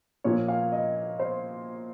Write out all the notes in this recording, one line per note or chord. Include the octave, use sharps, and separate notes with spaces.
A#2 F3 A#3 C#5
F5
D#5
C5